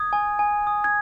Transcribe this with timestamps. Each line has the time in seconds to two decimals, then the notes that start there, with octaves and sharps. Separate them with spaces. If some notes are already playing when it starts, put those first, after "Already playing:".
Already playing: D#6 G#6
0.13 G#5
0.39 G#5
0.67 D#6
0.84 G#6